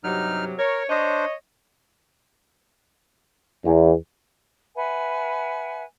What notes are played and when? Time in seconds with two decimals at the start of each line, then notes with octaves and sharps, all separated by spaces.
0.04 G2 C3 F#3 D#4 F6
0.58 A#4 C#5
0.90 D4 C5 C#5 D#5
3.65 E2
4.75 B4 E5 F#5 G#5